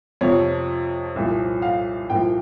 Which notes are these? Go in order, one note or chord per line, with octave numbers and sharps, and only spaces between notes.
F2 C3 F3 C#5
C2 A#2 F3
F5
C2 A#2 F3 G5